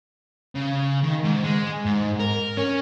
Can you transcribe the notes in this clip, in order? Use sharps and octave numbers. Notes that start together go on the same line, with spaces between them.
C#3
D#3
G#2
G#3
G#2
A#4
C#4